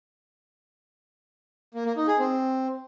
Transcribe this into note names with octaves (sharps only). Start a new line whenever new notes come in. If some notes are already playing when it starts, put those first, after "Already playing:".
A#3
A#3
D#4
G#4
C4